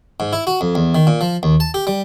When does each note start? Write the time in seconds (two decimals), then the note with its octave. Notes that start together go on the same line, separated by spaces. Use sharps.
0.20 G#2
0.33 E4
0.47 F#4
0.61 F2
0.75 E2
0.95 D#3
1.07 A#2
1.21 F3
1.43 D#2
1.60 A5
1.74 G4
1.87 G3